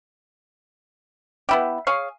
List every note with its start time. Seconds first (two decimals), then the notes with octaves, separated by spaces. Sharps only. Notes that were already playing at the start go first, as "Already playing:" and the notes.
1.49 B3 E4 G4
1.87 G#4 C#5 F5